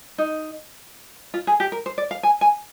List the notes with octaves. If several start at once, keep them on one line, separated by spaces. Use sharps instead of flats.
D#4
F4
G#4
G4
A#4
C5
D5
F5
G#5
G#5